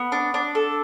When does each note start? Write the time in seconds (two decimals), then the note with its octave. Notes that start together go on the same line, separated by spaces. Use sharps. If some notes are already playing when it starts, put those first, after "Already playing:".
Already playing: B3
0.12 D4
0.34 D4
0.55 A4